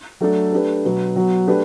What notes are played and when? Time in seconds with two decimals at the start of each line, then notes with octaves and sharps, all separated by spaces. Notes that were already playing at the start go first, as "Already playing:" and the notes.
0.21 F#3 A3 D4 A4
0.52 A3 D4 G4 B4
0.84 B2 F#3 B3 F#4
1.16 F#3 B3 F#4
1.48 A3 D4 G4 B4